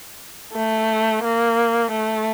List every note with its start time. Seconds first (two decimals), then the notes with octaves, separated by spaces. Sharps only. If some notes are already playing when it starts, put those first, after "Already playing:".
0.53 A3
1.24 A#3
1.92 A3